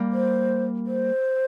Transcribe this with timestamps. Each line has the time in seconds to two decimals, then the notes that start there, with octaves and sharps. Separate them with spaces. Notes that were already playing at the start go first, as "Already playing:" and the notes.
Already playing: G3 A#3
0.13 C5
0.87 C5